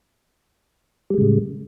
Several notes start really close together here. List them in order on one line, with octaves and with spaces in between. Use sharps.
G3 G#3 C#3 A2